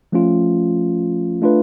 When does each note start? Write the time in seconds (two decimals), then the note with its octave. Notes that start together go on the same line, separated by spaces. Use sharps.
0.12 F3 A3 C#4 F4
1.42 A3 D4 F4 B4